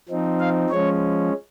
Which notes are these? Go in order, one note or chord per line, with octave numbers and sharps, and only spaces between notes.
F3 C4 D#4
F5
F3 G#3 C#4 C#5